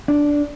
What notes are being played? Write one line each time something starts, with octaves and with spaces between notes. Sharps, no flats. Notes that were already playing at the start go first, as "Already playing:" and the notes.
D4